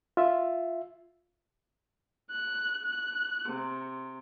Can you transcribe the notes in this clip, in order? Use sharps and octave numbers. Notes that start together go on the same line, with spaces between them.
F4 E5
F#6
F#6
C3